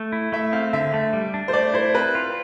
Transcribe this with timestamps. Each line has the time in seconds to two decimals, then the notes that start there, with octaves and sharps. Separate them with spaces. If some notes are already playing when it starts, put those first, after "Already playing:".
Already playing: A3
0.12 E4
0.32 A3 E5
0.53 C4 F5
0.73 D3 E5
0.94 A3
1.13 G3
1.34 D4
1.48 C5
1.53 A3 D5
1.74 E4 C5
1.94 C4 B4
2.15 F4